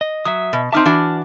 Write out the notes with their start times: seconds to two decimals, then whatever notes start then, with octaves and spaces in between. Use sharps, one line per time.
0.01 D#5
0.25 F#3 E5 D#6
0.53 B2
0.72 C4 D#4 E5 A5 D6 F6
0.86 E3 D4 F#4